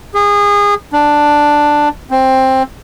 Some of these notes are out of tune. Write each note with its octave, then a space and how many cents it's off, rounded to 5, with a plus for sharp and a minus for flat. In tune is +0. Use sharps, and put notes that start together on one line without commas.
G#4 -25
D4 +5
C4 +10